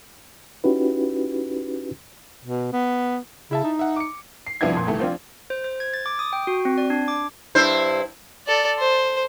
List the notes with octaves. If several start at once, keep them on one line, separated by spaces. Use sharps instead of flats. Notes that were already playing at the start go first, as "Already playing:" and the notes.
C#4 D#4 E4 F#4 G4 B4
B2
B3
C#3 E4 E5 A5
D#4
E5 F#5
D6 C#7
C7
C2 F3 B3 D4 E4 G#6
F2 A#2
C2 D#3 E3 A3
F3 C4 D4 F4
C5
C5
G#6
A6
D6
D#6
G5
F#4
C4
D5
D4
D6
G2 E4 C5
A4 D5
C5